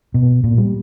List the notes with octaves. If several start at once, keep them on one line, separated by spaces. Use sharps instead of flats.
B2
A#2
G3